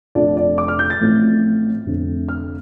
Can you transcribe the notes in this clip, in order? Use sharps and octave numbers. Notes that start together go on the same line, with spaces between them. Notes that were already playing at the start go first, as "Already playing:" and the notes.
F1 F2 F3 D4 F4 D5
D5
D6
F6
G6
A6
A1 A2 F3 C4 F4
F1 F2 D3 A3 C4
F6